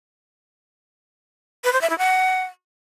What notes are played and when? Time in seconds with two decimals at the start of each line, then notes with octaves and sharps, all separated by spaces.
1.64 B4
1.73 C5
1.81 E5
1.90 E4
1.98 F#5